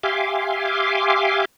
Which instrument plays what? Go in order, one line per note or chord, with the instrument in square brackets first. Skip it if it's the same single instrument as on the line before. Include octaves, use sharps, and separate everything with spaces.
[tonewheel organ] G4 E5 F5 G#5 C6 D6